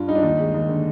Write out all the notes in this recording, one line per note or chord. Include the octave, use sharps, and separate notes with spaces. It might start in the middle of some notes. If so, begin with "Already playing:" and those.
Already playing: G2 F4
G3 D#4
D4
D#2 D#4
G#3
D#2
D3